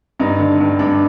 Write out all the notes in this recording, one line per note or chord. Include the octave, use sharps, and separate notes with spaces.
G2 D#4
D3
G2
G2 D4